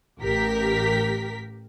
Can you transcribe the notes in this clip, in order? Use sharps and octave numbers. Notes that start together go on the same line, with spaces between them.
A1 G4 A#4 B6